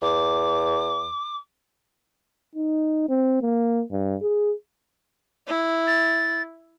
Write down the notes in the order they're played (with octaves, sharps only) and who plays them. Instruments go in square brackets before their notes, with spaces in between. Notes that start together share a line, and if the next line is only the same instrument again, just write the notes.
[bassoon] E2 [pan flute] D6
[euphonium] D#4
C4
A#3
G2
G#4
[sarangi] E4
[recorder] A6